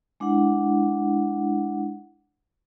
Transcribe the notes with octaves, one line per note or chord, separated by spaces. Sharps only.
G#3 D4 E4 F#5